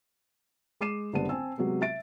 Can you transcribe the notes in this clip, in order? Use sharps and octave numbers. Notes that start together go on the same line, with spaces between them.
G#3 D6 C7 D#7 E7
F#1 D3 G3 B3 A5 D#7
C4 G#5 A5 E6
C3 F#3 G#3 B3
E5 A6 D7